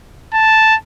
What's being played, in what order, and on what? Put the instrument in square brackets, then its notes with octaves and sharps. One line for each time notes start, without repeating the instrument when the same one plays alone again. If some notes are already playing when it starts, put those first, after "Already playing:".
[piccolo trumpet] A5